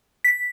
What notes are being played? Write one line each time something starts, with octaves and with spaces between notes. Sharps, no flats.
B6